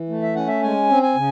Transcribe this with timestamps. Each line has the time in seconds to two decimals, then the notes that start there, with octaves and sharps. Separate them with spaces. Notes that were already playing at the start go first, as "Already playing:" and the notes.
Already playing: E3
0.09 A3
0.22 E5
0.35 C#4 F#5
0.47 E5
0.62 G#3 G#5
0.89 C4
1.03 G#5
1.16 C#3